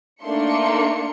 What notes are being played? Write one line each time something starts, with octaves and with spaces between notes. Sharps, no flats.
A3 A#3 D4 D#4 C6 C#7